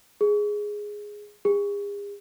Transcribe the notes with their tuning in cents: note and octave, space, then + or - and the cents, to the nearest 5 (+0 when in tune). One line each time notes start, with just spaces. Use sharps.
G#4 +0
G#4 -40